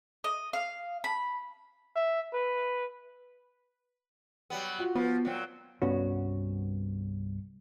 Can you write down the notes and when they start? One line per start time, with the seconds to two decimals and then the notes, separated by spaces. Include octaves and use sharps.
0.24 D#5
0.53 F5
1.04 B5
1.96 E5
2.33 B4
4.50 F#3 G3 B3
4.79 F4 F#4
4.95 F3 B3
5.25 A#2 F#3 C4
5.82 C2 G2 B3 C#4 F#4